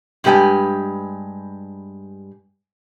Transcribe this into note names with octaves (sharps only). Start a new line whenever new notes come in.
G2 G#3 G4 B4 G5 G#5